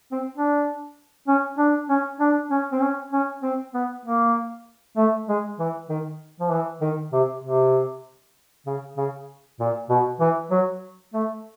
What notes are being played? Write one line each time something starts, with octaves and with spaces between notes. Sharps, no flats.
C4
D4
C#4
D4
C#4
D4
C#4
C4
C#4
C#4
C4
B3
A#3
A3
G#3
E3
D#3
F3
E3
D#3
C3
C3
C#3
C#3
A#2
B2
E3
F#3
A3